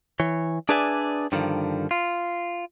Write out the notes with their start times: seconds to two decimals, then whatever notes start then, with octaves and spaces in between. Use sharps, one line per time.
0.20 E3 C#5
0.69 D4 G#4 B4 D5 E5 G#5
1.32 G2 D3 D#3 F3
1.91 F4